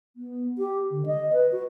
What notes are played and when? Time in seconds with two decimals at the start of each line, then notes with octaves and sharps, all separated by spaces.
0.16 B3
0.58 G4
0.91 D3
1.06 D#5
1.33 B4
1.52 F#4